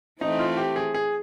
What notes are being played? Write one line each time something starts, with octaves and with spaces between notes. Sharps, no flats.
E3 A3 C4 D#4
F4
G4
G#4
G#4